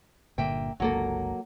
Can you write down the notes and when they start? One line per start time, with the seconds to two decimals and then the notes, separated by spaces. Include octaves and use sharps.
0.38 G1 A#2 D3 A#3 E5 G5
0.80 G1 C#2 F#3 A#3 A4